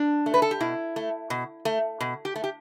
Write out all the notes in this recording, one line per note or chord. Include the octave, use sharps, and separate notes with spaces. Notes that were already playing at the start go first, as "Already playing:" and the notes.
Already playing: D4
A3
B4
A4
G4
B2 E4
A3
B2
A3
B2
G4
A3
G4